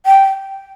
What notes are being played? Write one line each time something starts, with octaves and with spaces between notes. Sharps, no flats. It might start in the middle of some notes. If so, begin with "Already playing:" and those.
G5